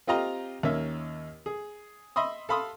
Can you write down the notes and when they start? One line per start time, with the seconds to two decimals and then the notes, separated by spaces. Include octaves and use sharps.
0.07 C4 F4 G4 D#5 F5 A#5
0.63 D#2 A#3 C#4 E5
1.46 G#4
2.16 D#5 E5 B5 C6 D#6
2.49 A4 F5 B5 C6 D#6